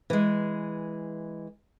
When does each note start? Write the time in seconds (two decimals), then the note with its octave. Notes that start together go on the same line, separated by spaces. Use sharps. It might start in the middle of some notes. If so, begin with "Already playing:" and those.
0.10 E3 G#3